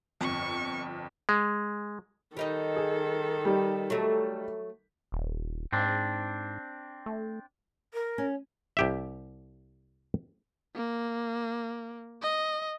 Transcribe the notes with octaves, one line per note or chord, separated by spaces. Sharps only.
G1 F2 C#6
G#3
D#3 G3 D#4 A4 D#5
G#4
G3 D#4 G4
F#3 A3
D#1
G#2 C4 D4
A3
A#4
C#4
C2 G4 E5
A#3
D#5